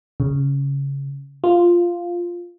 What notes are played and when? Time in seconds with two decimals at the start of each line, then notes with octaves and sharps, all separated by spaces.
0.20 C#3
1.44 F4